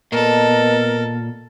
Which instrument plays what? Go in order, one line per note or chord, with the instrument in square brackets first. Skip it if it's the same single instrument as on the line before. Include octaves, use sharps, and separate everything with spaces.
[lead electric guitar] A#2 [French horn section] B3 D#5 [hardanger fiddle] A4 [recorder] A#4